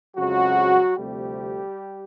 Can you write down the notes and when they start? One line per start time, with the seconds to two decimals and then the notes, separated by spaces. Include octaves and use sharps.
0.16 F2 C#3 F3 F#3 G#3 F#4
0.97 D2 C3 F3 G3 A3 C4 G4